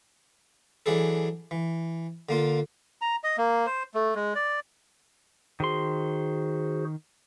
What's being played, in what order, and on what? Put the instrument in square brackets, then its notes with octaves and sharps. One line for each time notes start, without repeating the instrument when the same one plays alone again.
[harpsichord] E3 F#3 D4 G#4 A4
E3
D3 A#3 F4
[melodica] A#5
D#5
A#3
C5
A3
G#3
D5
[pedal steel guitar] D#3 C6 [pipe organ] F#4 G#4 C5